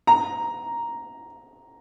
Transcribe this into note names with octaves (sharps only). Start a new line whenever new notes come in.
A#5